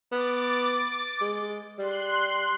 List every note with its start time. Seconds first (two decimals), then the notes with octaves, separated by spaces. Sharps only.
0.11 B3 D6 A6
1.21 G#3
1.79 G3 C6 F#6